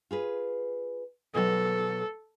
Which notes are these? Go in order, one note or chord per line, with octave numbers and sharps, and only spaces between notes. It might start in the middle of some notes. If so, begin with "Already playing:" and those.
F4 G#4 B4
B2 F#3 A4